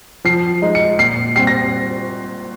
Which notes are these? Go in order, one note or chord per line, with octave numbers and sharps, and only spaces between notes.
F3 C7
G#3 D#4
C#7
A#2 C7
G3 C4 C7
A#6